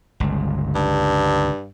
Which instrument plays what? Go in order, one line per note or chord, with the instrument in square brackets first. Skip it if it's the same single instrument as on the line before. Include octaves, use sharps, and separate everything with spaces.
[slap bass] G1 C#2
[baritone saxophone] G2